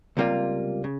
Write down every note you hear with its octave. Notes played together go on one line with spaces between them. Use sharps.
C#2 C3 G3 A#3 F4
C#3